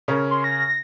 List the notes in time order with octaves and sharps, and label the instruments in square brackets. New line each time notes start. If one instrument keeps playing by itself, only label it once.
[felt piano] C#3 C#4 A#4
[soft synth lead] C6
A#6